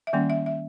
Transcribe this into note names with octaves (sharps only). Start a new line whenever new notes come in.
E5
D#3 G3 A#3 C#4 G5
E5
E5